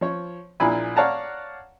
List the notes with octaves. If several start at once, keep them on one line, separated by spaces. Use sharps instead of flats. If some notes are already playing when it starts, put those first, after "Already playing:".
F3 C#5
A#1 A#2 E4 G#5 B5
C#5 D5 F5 F#5 A5 A#5